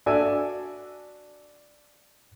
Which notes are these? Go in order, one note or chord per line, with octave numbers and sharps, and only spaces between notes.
D4 F#4 A4 D5 E5 G#5